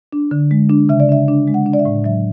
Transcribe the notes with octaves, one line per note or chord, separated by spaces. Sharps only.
D4
D3
G#3
D4
C#3 E5
D5
D4 E5
D4
G#3
F#5
D4
D5
E5
A2
F#3 E5